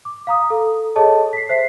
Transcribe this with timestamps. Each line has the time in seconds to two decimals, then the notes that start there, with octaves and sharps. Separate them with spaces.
0.05 D6
0.27 F5 A#5 D#6
0.50 A4
0.96 G#4 A4 C#5 D#5 A5
1.33 B6 C7
1.49 C5 E5 B6 C7